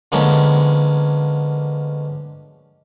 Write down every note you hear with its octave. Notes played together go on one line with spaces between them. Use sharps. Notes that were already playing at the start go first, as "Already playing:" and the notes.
D3 F3 G#3 A#3 B3 C#4